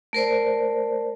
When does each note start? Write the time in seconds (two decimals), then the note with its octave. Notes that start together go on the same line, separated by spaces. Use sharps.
0.13 A3 A#4 C5 D5